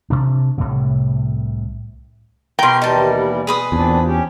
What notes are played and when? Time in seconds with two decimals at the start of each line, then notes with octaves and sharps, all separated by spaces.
0.10 C3 D4
0.58 C2 A2 C3
2.59 B2 A#4 G5 C6
2.82 D#2 E3 G3 D#4 A5
3.47 G#4 B4 D#6
3.72 E2 A#2 C4 D4
4.06 C#4 G4